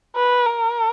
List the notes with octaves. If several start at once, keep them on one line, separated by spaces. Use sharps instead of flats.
B4
A#4